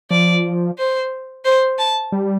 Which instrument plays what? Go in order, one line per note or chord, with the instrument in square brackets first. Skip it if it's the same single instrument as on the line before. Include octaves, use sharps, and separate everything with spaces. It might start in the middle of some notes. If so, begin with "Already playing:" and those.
[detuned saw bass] F3 [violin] D5
[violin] C5
C5
A5
[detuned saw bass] G3